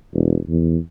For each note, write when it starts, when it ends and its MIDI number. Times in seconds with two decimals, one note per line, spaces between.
0.13 0.37 28
0.49 0.77 40